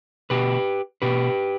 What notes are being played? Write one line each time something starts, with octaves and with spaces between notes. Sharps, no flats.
B2 G4 B4
B2 G4 B4